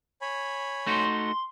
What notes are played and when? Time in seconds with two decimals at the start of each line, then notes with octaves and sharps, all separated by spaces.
0.21 C#5 G#5 B5
0.86 A3 D#4 F#4 C6